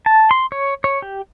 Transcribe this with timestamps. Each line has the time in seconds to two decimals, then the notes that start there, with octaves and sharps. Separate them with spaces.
0.06 A5
0.31 C6
0.52 C#5
0.84 C#5
1.02 G4